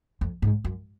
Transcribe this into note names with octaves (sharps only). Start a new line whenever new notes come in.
F2
G#2
F#2